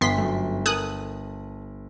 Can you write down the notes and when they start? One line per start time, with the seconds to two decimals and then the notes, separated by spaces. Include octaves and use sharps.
0.01 G1 B3 C6 B6
0.18 F#2 A3
0.66 A4 A#4 G#5 D#6 F#6